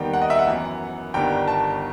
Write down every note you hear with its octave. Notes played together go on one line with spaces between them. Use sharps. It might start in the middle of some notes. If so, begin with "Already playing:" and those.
Already playing: D#2 D#3 G3 B3 G5
F#5
D#5
E5
F#5
F#2 E3 B3
G1 G2 D#3 G3 B3 G5
A5